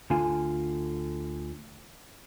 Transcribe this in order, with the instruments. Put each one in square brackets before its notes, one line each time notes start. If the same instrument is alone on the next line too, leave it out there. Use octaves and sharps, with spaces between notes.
[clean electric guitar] D2 D3 F4 F5 G#5